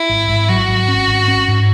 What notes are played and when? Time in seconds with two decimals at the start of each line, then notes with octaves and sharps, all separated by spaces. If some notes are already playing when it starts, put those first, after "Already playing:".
Already playing: E4
0.09 G#1
0.29 G#1
0.49 F#3 F#4
0.68 G#1
0.88 C#4
1.08 G#1
1.28 C#4
1.48 G#2